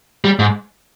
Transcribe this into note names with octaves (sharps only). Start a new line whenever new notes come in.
G3
G#2